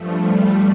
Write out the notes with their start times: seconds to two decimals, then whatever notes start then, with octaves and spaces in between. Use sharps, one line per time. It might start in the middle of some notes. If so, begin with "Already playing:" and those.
Already playing: G2 F3 A3
0.22 G3